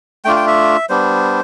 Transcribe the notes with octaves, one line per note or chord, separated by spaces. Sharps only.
A3 D4 F4 G5
G5
E5
G3 B3 D4 C5